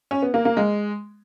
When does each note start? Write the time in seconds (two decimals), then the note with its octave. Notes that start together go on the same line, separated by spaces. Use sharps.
0.11 C#4
0.22 B3
0.34 A#3
0.45 A#3
0.57 G#3